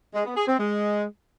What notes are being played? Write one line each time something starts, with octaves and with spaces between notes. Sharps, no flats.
G#3
B3
G#4
C4
G#3